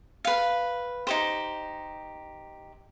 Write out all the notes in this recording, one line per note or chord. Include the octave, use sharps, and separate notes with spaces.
B4 F5
D#4 G4 C5